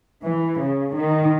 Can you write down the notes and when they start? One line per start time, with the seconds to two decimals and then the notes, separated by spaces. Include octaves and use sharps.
0.23 E3
0.60 C#3
0.95 D#3